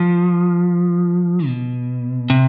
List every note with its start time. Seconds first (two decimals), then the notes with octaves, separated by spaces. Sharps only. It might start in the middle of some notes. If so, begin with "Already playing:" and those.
Already playing: F3
1.47 B2
2.30 C3